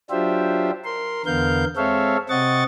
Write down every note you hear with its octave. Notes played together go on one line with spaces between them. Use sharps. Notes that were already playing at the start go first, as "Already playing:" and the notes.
F#3 D4 F4 G4 C5 E5
A#4 C6
E2 D3 B3 A#4 F5 G6
G#3 C4 A4 C#5 E5 F5
C3 C4 D#5 F#5 C#6 A6